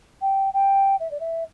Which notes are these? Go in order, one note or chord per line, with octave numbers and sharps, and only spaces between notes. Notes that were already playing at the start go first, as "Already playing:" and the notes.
G5
G5
E5
D5
E5